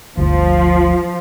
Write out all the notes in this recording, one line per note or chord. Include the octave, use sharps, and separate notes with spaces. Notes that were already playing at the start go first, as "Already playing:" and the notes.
G1 D2 F3